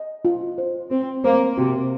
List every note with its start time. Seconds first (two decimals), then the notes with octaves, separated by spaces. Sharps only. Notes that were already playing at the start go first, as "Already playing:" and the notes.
Already playing: D#5
0.25 F4
0.58 C5
0.91 C4 C5
1.24 A#3 C5
1.57 C3 F#4